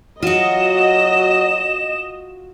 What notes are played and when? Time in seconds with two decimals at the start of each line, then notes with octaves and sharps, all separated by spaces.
0.22 F#3 F4 F#4 D#5 E7